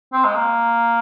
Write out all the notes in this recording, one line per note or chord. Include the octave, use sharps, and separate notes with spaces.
C4
G#3
A#3